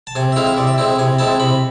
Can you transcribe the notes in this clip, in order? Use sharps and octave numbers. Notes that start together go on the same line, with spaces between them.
A5
C3 G#5
E5
G#3 C4 E4 F5
E5
C3 D5
E5
G#3 C4 E4
C3 G#5
G#3 C4 E4 A5
C3 B5